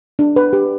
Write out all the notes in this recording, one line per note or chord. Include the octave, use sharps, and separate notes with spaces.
D4
B4
G4